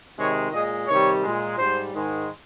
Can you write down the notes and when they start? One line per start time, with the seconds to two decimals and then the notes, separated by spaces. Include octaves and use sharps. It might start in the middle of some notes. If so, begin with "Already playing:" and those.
0.17 C3 D#3 G#3 C#5
0.52 A#2 G#3 D#5
0.88 C3 D#3 G3 C#5
1.23 A#2 G#3
1.58 G#2 G3 C5
1.93 G#2 D#3 G#3